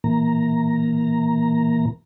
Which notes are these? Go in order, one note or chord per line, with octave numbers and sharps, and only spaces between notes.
A#2 E3 A#3 A#5